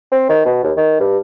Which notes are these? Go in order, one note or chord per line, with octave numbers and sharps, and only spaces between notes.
C4
D#3
B2
D#2
D#3
G2